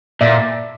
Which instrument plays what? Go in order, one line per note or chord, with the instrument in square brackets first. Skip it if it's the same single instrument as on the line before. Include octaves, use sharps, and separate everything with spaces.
[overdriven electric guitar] A#2 [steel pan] D5 E5